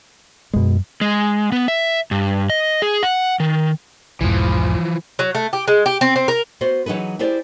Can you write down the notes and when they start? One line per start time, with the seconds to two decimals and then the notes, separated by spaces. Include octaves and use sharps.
0.54 F#2 B2 G#3
1.01 G#3
1.52 B3
1.68 E5
2.11 G2
2.50 D#5
2.82 G#4
3.03 F#5
3.40 D#3
4.21 B1 E2 G#2 E3 F3
5.19 F#3
5.35 A3
5.53 G4
5.68 G#3
5.86 G4
6.01 C4
6.16 C4
6.28 A#4
6.61 B3 F#4 C5
6.86 E3 F#3 D#4 G#4 B4
7.19 E4 G4 G#4 C5 D5